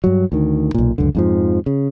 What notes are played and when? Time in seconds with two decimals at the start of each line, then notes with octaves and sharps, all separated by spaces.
0.04 G2 F#3
0.32 D2 D#3
0.74 B1 A#2
0.98 C#2 F#2 D3
1.15 F2 G#2 F3
1.66 C#3